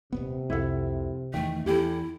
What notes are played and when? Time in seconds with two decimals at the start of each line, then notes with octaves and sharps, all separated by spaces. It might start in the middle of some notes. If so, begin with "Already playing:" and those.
0.13 D#1 F2 C3 B3
0.50 C2 F2 E4 A4 F#5
1.34 E2 D#3 A3 G5
1.66 E2 E4 G4 A4